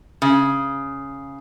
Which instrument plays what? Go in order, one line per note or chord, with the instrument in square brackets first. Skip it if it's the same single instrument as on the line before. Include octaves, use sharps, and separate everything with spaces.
[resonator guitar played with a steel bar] C#3